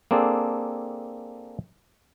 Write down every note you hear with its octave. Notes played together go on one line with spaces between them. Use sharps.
A#3 C4 D4 G#4 A4